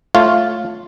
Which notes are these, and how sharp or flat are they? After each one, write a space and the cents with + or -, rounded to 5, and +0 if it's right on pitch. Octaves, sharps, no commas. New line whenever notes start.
A3 +0 F4 +0 C#5 +0